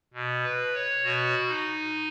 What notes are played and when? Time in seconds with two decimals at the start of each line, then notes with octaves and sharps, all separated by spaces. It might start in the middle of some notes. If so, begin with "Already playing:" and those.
0.14 B2
0.43 B4
0.74 C#5
1.03 B2 F#4
1.48 D#4